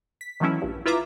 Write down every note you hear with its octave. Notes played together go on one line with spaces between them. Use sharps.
B6
D#3 E3 F#3 A3 C#4 E4
A#1 G2
E4 F4 B4 E5 A#5 D6